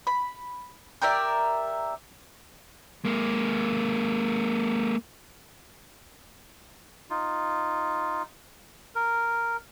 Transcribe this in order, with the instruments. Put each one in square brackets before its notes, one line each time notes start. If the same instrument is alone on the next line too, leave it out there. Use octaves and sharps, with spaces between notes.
[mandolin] B5
G4 A#4 D5 E5
[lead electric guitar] G#3 A#3
[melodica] D#4 F4
A#4